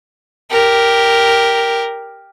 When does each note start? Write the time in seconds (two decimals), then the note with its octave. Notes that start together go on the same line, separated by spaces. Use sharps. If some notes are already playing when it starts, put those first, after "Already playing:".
0.51 G4 A#4